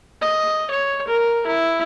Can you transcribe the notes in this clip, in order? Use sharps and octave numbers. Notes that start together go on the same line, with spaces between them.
D#5
C#5
A#4
E4